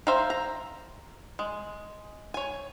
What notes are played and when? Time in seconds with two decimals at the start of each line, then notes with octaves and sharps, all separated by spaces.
0.07 C5 E5 F5 G5 A#5
0.30 A#5
1.39 G#3
2.34 C#5 G#5